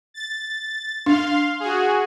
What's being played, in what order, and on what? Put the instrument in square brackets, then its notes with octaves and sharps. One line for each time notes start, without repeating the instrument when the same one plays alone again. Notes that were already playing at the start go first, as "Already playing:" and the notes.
[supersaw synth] A6
[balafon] D4 [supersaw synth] F5 C6
[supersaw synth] F#4 G#4